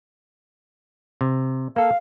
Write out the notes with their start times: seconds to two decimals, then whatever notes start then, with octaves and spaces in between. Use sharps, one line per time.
1.21 C3
1.76 A#3 A4 F5